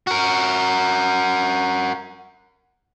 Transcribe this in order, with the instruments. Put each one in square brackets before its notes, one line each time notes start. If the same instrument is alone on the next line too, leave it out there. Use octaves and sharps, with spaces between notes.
[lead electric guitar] F#4 A#4